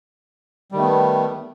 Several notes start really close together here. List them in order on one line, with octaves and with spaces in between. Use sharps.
G3 D#3 A3 B3